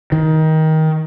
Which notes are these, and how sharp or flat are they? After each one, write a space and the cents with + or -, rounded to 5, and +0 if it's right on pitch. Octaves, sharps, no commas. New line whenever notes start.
D#3 +20